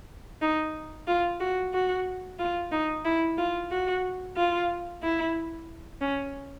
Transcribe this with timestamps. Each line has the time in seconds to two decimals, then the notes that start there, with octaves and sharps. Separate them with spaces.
0.42 D#4
1.08 F4
1.41 F#4
1.73 F#4
2.39 F4
2.72 D#4
3.05 E4
3.38 F4
3.71 F#4
4.37 F4
5.03 E4
6.01 C#4